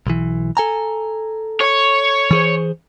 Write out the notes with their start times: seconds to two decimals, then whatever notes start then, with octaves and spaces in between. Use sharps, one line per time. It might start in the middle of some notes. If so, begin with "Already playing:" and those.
0.07 B1 E3
0.57 A4 G#5 A#5
1.61 C#5
2.31 E3 G#4 C5